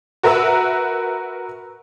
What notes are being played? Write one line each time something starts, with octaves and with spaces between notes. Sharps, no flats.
F#4 A#4 B4 E5 E6